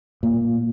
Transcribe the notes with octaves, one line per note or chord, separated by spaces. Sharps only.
A#2